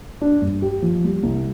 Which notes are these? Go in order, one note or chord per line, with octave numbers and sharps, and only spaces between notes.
D4
G2
G4
F3
G3
C2